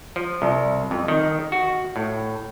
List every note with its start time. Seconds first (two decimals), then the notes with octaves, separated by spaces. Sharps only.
0.16 F3
0.42 C2
0.91 F2
1.08 D#3
1.52 F#4
1.96 A2